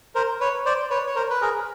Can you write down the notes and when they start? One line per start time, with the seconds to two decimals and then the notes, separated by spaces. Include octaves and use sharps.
0.15 A#4 C5
0.40 B4 C#5
0.66 C5 D5
0.90 B4 C#5
1.07 C#5
1.16 A#4 C5
1.30 B4
1.41 G#4 A#4